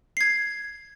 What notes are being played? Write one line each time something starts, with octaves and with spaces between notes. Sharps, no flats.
G#6 C7